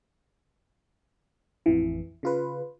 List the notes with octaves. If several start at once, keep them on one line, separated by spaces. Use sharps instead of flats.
A1 F2 E3
C#3 F4 B4